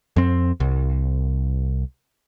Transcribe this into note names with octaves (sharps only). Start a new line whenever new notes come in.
F2 C4
C2